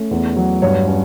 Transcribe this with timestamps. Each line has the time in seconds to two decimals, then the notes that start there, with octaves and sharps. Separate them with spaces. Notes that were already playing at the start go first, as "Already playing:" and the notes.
Already playing: A3 C#4
0.11 E2
0.36 F#3
0.62 G2 C#5
0.87 C#4